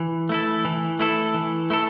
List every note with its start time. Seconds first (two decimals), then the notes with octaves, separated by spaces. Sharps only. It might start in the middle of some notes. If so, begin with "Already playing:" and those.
Already playing: E3
0.29 A3 E4 A4
0.65 E3
0.99 A3 E4 A4
1.34 E3
1.70 A3 E4 A4